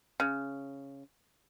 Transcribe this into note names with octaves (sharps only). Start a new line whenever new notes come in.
C#3